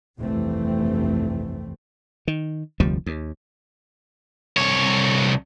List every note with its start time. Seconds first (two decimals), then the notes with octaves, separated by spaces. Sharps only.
0.19 F1 C2 G2 E3 A3 C4
2.28 D#3
2.80 F1 D2 F3 G3
3.06 D#2
4.57 C2 C#5